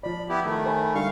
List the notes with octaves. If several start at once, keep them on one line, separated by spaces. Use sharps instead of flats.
F3 D5 B5
B3 E4 G4
D#3 A3
C5 G#5 B5
D3 G3 D#4 F5 C#6